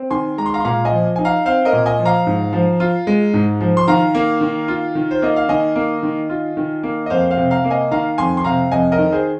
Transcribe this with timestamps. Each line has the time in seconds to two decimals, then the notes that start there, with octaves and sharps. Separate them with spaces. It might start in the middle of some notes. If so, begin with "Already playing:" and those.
Already playing: C4
0.11 D#3 G#5 C6
0.38 G#3 A#5
0.46 C6
0.54 F5 A#5
0.60 C6
0.65 A#2 F5 A#5
0.85 D#5 G#5
0.92 F3
1.16 D#4 G#5
1.25 F5 A#5
1.45 C4 C5 F5
1.65 A#4 D#5
1.73 A#2
1.86 D#5 G#5
1.99 F3
2.05 F5 A#5
2.27 G#2
2.53 F3
2.80 F4
3.07 G#3
3.34 G#2
3.61 F3
3.77 C6
3.88 D#3 F5 A#5
4.15 A#3
4.41 D#3
4.68 F4
4.95 D#3
5.11 C5
5.22 A#3 D#5
5.36 F5
5.49 D#3 D#5 G#5
5.76 A#3
6.03 D#3
6.30 F4
6.57 D#3
6.83 A#3
7.06 D#5
7.10 F2 C5 F5
7.30 C5 F5
7.37 C3
7.51 F5 A#5
7.64 A#3
7.70 D#5 G#5
7.91 D#3 F5 A#5
8.18 F2 G#5 C6
8.37 C6
8.44 C3 F5 A#5
8.72 F2 D#5 G#5
8.92 A#4 D#5
8.98 D#3
9.12 G#4 C5